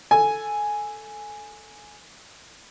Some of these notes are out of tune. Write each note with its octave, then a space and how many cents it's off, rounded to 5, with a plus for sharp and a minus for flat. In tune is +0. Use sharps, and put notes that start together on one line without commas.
A4 +0 G#5 +0